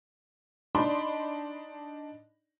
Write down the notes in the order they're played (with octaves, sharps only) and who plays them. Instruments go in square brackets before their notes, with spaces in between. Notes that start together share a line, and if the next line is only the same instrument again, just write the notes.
[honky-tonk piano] D4 D#4 D5 B5 C6